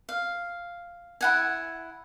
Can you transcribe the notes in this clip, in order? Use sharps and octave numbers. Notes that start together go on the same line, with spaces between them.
F5
E4 F#5 G#5